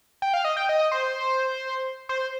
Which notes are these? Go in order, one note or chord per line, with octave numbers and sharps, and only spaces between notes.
G5
F5
D#5
G5
D#5
C5
C5